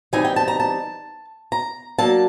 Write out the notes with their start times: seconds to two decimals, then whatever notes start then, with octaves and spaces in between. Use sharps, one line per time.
0.13 E3 G3 C4 D#4 G#5
0.25 G5
0.36 A5
0.48 A#5
0.60 A5
1.52 A#5
1.98 F#3 A#3 D4 A5